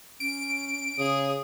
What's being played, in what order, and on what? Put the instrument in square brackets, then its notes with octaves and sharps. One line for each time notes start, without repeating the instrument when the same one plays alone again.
[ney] C#4 [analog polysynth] D7
[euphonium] C#3 [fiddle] G#4 D#6